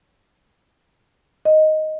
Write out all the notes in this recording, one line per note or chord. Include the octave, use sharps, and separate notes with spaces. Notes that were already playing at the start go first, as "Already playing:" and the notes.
D#5